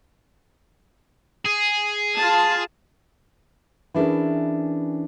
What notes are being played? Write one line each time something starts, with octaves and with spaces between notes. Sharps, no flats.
G#4
F4 A5
E3 C#4 D4 E4 G#4 A#4